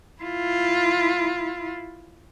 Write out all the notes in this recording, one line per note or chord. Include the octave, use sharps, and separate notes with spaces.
E4 F4